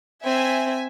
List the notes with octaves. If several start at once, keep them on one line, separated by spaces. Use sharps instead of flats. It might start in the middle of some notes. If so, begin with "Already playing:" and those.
C4 E5 G#5